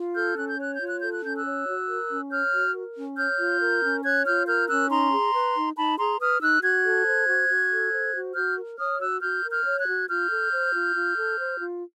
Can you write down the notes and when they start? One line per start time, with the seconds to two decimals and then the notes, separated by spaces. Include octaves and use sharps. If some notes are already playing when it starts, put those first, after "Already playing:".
Already playing: F4
0.14 A4 F6 G6
0.36 C#4 F#6
0.49 G6
0.58 C#5 F#6
0.74 G6
0.80 F4
0.87 F#6
0.99 A4 G6
1.12 F#6
1.23 C#4 G6
1.36 E6 F#6
1.44 C#5
1.66 F#4
1.88 A#4
2.10 C#4
2.31 C#5 F6 G6
2.53 F#4
2.74 A#4
2.95 C#4
3.17 C#5 F6 G6
3.39 F4
3.60 A#4
3.82 C#4
4.03 C#5 F#6 G#6
4.25 F4 F6 G6
4.47 A#4 F6 G6
4.68 C#4 E6 F#6
4.90 D#4 A#5 C6
5.11 G#4
5.33 B4
5.54 D#4
5.76 D#4 A5 B5
5.97 G#4 A#5 C6
6.19 B4 D#6 F6
6.41 D#4 E6 F#6
6.63 F#4 F#6 G#6
6.84 A4
7.06 C5
7.27 F#4
7.49 F#4
7.71 A4
7.92 C5
8.14 F#4
8.35 F#4 F6 G6
8.57 A#4
8.78 C#5 D#6 F6
9.00 F#4 E6 F#6
9.21 F#4 F6 G6
9.43 A#4
9.50 F6 G6
9.65 C#5
9.79 F#6 G#6
9.87 F#4
10.08 F4 F6 G6
10.30 A4
10.52 C5
10.72 F4
10.94 F4
11.16 A4
11.38 C5
11.60 F4